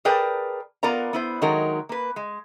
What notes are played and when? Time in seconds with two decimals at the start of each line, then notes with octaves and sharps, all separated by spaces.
0.05 G#4 A#4 B4 D5 G5 A5
0.83 B3 F4 A#4 D5 A#5
1.13 B3 E4 C5
1.42 D#3 F#3 G#3 A#4
1.89 A#3 B4
2.16 G#3